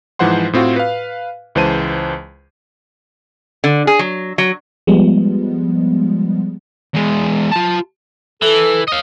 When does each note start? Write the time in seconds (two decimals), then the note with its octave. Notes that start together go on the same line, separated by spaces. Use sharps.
0.19 G#2 E3 F3 C5 F#5 C6
0.53 A2 C4 F4 F#4
0.76 B4 F5
1.55 C#2 E3 G#3 C5 A5 D#7
3.64 D3
3.87 G#4
3.99 F#3
4.38 F#3
4.87 F3 G3 G#3 B3
6.94 E2 G#3
7.51 F4 A5
8.42 E3 A4
8.88 D#5 F5